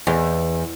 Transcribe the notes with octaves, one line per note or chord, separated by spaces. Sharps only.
E2